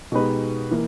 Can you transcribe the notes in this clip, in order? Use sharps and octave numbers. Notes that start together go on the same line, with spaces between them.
B2 G#3 D#4 G4 B4
E3 A#3